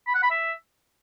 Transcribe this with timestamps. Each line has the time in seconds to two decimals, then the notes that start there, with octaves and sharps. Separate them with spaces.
0.07 B5
0.15 F#5
0.23 B5
0.31 E5